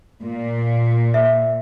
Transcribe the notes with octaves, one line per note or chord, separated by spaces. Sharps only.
A#2
E5